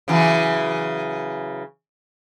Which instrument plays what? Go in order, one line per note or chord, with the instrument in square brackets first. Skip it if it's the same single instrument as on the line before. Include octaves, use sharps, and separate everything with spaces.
[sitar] C#3 E3 F#3